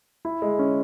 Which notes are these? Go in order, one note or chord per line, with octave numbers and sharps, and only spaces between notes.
E4
G#3
C#4